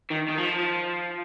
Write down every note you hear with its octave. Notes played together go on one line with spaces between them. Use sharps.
D#3
D#3
F3